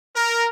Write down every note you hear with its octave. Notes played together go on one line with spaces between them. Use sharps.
A#4